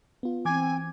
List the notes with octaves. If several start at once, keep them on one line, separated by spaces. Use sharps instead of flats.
B3 F4
E3 C4 G#5 D6 G#6